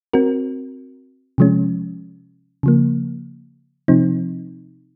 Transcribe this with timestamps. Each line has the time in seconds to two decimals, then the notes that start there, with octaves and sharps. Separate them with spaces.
0.13 C4 F#4 A#4
1.38 C3 F3 G#3 C#4
2.63 C#3 F3 A#3
3.88 C3 F3 C4 D#4